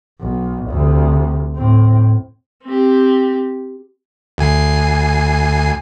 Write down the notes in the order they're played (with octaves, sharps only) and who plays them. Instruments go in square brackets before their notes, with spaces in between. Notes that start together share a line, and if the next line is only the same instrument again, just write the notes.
[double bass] B1
D2 C3
A2 C4
[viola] C4 G4
[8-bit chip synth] D2 G#5 C7